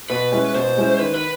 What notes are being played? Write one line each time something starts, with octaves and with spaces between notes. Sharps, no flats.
B2 B4
G#3 C#4 E4
B2 C5
G#3 C#4 E4
D#3 B4
B4